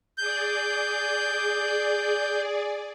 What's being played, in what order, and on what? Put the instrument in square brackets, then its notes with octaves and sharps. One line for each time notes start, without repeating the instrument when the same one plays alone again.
[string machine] G#4 D5 [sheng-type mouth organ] G6